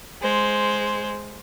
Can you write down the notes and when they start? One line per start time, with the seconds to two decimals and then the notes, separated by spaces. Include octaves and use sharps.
0.22 G#3 C5